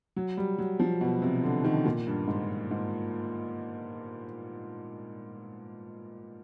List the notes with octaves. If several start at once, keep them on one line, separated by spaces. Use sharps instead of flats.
F#3
G3
F#3
F3
B2
C3
D3
D#3
A#2
G2
G#2
G#2